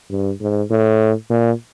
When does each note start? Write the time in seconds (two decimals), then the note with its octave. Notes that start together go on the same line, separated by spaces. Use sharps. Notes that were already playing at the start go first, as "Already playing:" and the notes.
0.10 G2
0.41 G#2
0.71 A2
1.30 A#2